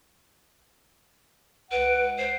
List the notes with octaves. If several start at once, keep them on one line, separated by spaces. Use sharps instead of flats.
C#2 B4 F#5 D7
C5 C7